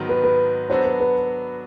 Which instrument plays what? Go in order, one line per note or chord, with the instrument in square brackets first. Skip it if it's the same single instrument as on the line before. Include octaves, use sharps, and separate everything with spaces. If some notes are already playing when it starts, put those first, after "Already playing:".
Already playing: [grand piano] G#2 D#3 F#3 B3
[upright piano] B4
B4
[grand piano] F#3 B3 D4 F#4 A4 [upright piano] C5
[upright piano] B4
B4